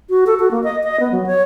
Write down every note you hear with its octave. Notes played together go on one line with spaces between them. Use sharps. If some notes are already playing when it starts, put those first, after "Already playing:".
F#4
A4
F#4
A#3
D#5
D#5
B3
F#3
C#5